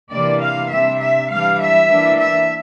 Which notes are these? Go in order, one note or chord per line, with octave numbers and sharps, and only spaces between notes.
C3 E3 A#3 D4 D5
F5
C3 G3 D4 E5
E5
E3 G3 D4 F5
E5
E3 A#3 D4
E5